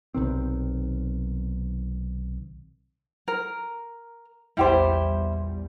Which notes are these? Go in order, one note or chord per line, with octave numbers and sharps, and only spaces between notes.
B1 C3 D#3 C4
A#4
A#1 E2 G3 E4 G4 C5